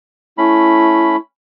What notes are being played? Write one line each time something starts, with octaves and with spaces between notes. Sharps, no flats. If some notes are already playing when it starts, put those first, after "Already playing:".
A3 C#4 E4 B5